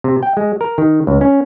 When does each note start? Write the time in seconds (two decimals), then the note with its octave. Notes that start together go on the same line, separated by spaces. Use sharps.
0.04 C3
0.23 G5
0.37 G#3
0.61 A#4
0.78 D#3
1.07 C#2
1.21 C#4